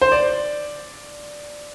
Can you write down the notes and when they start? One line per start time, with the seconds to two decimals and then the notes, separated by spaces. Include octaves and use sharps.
0.01 C5
0.12 D5